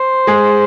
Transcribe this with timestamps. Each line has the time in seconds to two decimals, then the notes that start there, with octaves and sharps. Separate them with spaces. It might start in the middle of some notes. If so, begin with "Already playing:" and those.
Already playing: C5
0.27 G#3 G#4